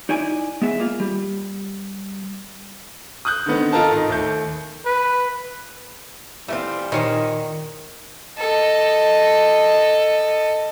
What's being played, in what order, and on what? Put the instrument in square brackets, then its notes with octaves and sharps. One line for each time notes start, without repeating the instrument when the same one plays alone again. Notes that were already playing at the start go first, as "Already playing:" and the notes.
[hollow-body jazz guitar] D#4 E4 D5 G#5
G#3 B3 E5
A#3 F4
G3
[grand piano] D#6 F#6 G6
D3 D#3 B3 C4
F4 A4 A#4 D#5 A5
G#2 D#3
D#2 A3 G6
[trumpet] B4
[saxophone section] E3 G3 [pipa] A3 F4 [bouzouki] C4 C#4 E4
[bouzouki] A#2 [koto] D#3 [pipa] C5 C#5 D#5
[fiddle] A4 D#5